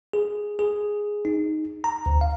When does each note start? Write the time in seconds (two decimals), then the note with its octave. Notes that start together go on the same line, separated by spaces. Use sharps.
0.13 G#4
0.59 G#4
1.25 D#4
1.84 A#5
2.06 D2
2.21 F5